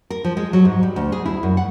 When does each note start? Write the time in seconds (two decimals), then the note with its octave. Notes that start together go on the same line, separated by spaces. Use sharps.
0.10 A#4
0.25 F3
0.37 G#3
0.53 F#3
0.65 G#2
0.83 G3
0.96 D2
1.12 G#4
1.26 E4
1.43 F#2
1.57 F#5